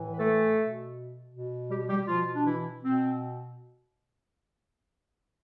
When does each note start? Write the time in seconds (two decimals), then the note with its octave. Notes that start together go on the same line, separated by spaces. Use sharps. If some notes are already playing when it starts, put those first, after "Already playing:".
Already playing: A2 E3
0.13 B4
0.19 A3 A4
0.56 B2
1.32 B2
1.70 G3 G4
1.89 G3 G4
2.08 B2 F3 F4
2.35 D4
2.46 E3 E4
2.84 B2 C4